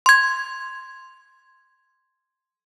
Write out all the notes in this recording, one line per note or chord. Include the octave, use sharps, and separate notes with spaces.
C6 G#6